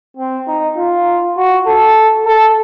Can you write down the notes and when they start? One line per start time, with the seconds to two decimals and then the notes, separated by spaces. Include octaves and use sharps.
0.17 C4
0.47 D#4
0.77 F4
1.37 F#4
1.66 A4
2.26 A4